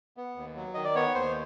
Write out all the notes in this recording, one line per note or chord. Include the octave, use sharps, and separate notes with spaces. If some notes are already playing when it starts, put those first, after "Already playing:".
B3
D#2
F#3
D#3 D#5
D5
B3 C#5
D#2 C5